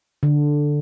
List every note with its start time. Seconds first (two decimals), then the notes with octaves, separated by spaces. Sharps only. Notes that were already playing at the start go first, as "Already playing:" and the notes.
0.23 D3